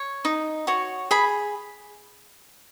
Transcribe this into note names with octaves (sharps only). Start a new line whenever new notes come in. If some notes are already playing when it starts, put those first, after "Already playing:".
Already playing: C#5
D#4
F#4 C#5
G#4 B5